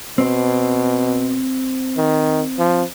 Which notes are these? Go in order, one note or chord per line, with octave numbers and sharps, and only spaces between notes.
B2 C4 C5
D#3
F3